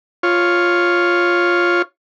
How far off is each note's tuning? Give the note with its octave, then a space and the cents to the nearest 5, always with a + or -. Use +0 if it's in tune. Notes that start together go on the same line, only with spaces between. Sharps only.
F4 +0 C#5 +0